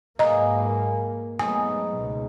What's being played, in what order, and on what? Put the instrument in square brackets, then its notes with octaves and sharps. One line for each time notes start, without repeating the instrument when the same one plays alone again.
[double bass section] G#2 F#3 A#3 [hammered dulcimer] F4 G#4 B4 [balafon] D#5 A#5
[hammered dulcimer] A#2 G#5
[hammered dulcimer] G#2 D#4 A#5 [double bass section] F#3 A3 B3 [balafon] G#5
[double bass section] C#2 B2